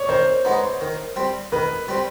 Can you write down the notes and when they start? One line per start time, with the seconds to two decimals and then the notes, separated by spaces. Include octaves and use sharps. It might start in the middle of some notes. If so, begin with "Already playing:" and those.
Already playing: C#5 D5
0.09 D#3 C5
0.45 G#3 B3 D#4
0.81 D#3
1.16 G3 C4
1.52 D#3 B4
1.88 G3 C4